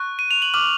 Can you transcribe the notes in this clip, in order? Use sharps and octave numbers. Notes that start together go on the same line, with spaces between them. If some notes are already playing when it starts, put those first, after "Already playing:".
Already playing: C#6 F#6
D#7
F7
F#7
D6 F6 F#7